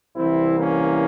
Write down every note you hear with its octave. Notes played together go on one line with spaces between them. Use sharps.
C2 C3 E3 C4 E4
A#3 C#4